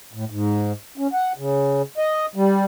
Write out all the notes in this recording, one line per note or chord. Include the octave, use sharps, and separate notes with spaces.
A2
G#2
C#4
F#5
C#3
D#5
G3